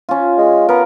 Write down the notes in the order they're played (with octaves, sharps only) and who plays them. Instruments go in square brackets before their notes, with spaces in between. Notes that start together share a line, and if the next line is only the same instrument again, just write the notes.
[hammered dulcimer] C#4 F4
[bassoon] G#3
[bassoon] B3 [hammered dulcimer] A#4